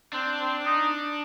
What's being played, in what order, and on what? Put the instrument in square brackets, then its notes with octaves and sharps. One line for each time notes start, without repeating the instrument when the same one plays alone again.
[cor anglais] C4 [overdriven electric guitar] D4
[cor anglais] C4
D#4